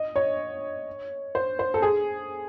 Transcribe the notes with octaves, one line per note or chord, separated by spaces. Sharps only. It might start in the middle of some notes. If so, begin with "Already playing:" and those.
Already playing: D#5
C#5
C5
C5
A4
G#4